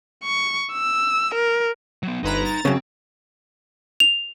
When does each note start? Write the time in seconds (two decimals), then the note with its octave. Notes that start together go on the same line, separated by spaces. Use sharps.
0.24 C#6
0.72 E6
1.35 A#4
2.03 F#3 B3
2.23 G1 D#4 B4 A#5 C6
2.45 A#5 A6
2.65 F#2 C#3 C4
4.00 F7